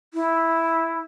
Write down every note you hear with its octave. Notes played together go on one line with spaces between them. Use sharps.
E4